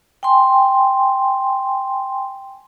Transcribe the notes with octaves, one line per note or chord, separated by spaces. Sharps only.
G5 G#5 C6